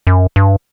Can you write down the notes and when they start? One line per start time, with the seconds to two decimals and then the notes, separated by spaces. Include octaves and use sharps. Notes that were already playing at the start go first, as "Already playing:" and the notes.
0.07 F#2
0.36 G2